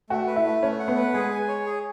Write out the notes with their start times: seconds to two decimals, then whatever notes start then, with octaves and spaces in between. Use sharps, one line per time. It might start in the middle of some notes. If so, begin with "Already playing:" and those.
0.10 A3 F#4
0.27 B4
0.36 E4
0.45 A3
0.62 A3 C#4
0.79 F#5
0.88 B3
0.97 B4
1.14 G#3 G#4
1.31 G#5
1.48 C#5
1.66 G#4